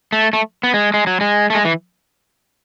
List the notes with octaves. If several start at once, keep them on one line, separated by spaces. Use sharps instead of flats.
A3
A3
B3
G#3
G#3
F#3
G#3
A3
G#3
E3